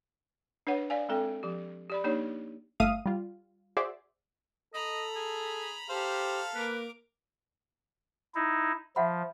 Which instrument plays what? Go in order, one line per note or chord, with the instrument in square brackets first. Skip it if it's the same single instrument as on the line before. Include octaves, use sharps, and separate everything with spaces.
[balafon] D4 B4 C#5 F#5
D5 F5 G#5
G#3 C4 A4 G5
F3 G4
G4 D5 B5
A#3 D4 D#4 G4 C#5
[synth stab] G1 A3 E5 F5 D#6 D#7
G3 F4
F#4 G#4 C5 D5 E5
[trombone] A4 [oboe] D#5 [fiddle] A#5 B5
[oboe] G#4
[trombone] G4 [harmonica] A4 F5 [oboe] C5
[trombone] A#3 [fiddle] A#4 D6 [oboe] B4
[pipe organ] D#4 E4
[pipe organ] F3 [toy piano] E5 F#5 B5